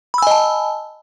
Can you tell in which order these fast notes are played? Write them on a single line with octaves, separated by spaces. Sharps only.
B5 E6 G#5 D#5 A5